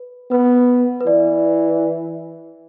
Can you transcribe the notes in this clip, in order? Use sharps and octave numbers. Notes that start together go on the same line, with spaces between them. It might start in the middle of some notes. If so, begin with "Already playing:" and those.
Already playing: B4
B3 B4
B4
E3 D5